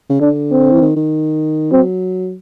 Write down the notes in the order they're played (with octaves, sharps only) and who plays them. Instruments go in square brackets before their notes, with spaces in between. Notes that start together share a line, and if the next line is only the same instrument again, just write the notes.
[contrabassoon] C#3
[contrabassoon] D3 [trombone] D4
[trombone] C4
[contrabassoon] E3
D#3
D#3
[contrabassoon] F#3 [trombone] C4